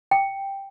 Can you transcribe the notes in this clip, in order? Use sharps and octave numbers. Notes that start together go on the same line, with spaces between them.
G5